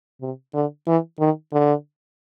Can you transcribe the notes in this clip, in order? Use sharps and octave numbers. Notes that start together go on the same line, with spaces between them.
C3
D3
E3
D#3
D3